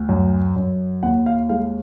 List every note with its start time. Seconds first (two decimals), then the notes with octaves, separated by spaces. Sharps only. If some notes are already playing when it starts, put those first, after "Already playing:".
Already playing: D2
0.09 F#2
0.56 F#2
1.03 D#2 F#5
1.26 F5
1.49 G#3 F5